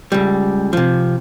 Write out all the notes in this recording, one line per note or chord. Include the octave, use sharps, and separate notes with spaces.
C#2 G3
C3 F3